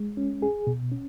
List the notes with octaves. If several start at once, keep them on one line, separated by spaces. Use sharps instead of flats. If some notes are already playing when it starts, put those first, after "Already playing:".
Already playing: G#3
C#4
G#4
B2
C#4